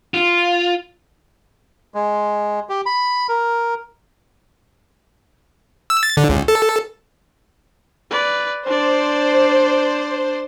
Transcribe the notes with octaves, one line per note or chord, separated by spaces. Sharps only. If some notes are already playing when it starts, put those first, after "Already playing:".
F4
G#3
G4
B5
A#4
E6
A6
D3
C#2
A4
B4 D5
D4 C5 D5